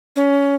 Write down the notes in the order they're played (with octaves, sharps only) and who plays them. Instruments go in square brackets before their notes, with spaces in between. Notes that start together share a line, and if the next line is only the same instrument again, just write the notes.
[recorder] C#4